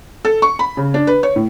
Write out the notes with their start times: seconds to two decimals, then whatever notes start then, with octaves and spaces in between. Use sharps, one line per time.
0.25 A4
0.42 C#6
0.59 B5
0.77 C#3
0.94 D4
1.07 B4
1.23 C#5
1.36 A2